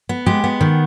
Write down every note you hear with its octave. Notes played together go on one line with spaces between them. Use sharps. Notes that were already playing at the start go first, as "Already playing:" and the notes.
B3
G#3 G4
B3
D#3